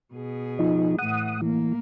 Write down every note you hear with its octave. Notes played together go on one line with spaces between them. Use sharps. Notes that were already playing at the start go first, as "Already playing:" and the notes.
B2 G#4
F3 D#4
A2 E3 F#5 D#6
E3 A#3